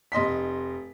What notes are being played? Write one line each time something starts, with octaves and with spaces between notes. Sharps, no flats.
F1 D#5 C6 B6